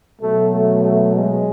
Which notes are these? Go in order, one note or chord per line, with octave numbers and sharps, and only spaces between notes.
B2 F#3 A3
A3
A3
G#3